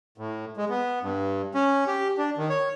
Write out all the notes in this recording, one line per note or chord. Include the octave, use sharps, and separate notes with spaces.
A2
G#3
B3
G2
C#4
G4
D4
D#3
C#5